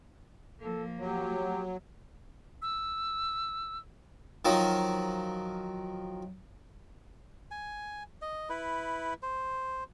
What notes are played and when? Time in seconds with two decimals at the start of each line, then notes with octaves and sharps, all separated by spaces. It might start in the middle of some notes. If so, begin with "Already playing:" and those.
0.60 F3 A#3 A4
0.99 F#3 G4
2.62 E6
4.45 D#3 F3 F#3
7.51 G#5
8.22 D#5
8.49 E4 B4
9.23 C5